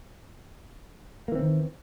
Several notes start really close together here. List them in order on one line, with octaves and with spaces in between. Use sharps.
A#3 E3 C4 D#3